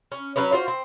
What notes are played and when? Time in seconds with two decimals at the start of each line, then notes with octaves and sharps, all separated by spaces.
0.12 C#4
0.36 F#3 C#4 B4 C#5
0.52 F4 F#4 C5
0.68 C4